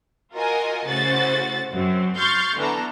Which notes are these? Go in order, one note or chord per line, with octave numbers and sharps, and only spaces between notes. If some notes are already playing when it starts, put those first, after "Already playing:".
F4 F#4 A#4 D#5 G#5
A2 C#3 F#4 C5 A6
F#2 F#3 C4
C6 C#6 F6 G6 A6 C7
D3 E3 B3 D4 A4 A#5